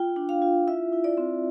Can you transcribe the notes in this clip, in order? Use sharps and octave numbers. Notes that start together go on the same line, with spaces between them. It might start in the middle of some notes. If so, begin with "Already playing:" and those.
Already playing: F4 G5
D4
F5
F4
E4 E5
E4
D5
C4